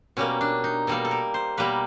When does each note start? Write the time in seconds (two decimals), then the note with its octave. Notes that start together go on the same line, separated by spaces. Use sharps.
0.17 B2 G3 A#3 C#4
0.41 D4
0.64 D#4
0.87 B2 G3 A#3 A4
1.05 A4
1.11 A#4
1.34 C5
1.57 B2 G3 A#3 B4